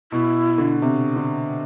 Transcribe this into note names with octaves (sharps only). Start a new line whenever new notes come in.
B2 E4
D3
C3
D3